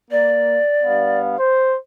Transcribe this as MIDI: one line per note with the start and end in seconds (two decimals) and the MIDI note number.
0.11 0.60 58
0.11 1.19 74
0.84 1.37 43
0.84 1.37 59
0.84 1.37 77
1.38 1.77 72